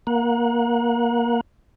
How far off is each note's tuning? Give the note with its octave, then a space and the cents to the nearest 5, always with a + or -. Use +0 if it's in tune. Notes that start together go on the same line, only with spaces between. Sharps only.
A#3 +15 F#5 -30